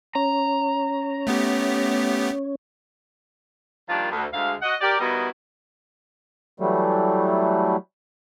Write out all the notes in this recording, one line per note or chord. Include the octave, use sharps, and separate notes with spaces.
C#4 C#5 A#5
A3 B3 G4
D#3 F3 G3 A#3 D4 F4
D2
D2 G#3 F5
F#4 D#5 F#5
G4 A#4 D5
D#3 G3 B3 E4 F#4 D#5
E3 F#3 G3 A3